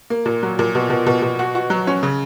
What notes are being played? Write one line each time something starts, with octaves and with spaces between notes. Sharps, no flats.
A#3
A#2
F#3
A#2
B2
B2
B2
B2
F#4
F#4
F#3
C#4
C#3